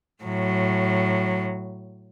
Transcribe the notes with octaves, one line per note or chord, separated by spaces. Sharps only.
A2 F#3